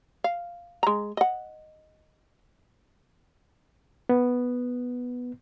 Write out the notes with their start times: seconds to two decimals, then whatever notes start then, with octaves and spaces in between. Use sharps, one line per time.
0.24 F5
0.83 G#3 A#5
1.17 D#5 F#5
4.09 B3